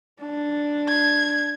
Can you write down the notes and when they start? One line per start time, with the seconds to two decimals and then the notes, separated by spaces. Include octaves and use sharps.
0.22 D4
0.88 G#6